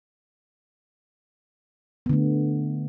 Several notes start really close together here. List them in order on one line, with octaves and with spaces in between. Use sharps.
B3 D3 A3